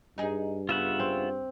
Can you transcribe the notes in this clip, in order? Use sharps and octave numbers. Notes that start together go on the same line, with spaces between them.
G2 D#4 G#4
C#3 B3 F4 E5 F#5
C4